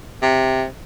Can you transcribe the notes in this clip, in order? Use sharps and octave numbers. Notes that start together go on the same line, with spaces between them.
C3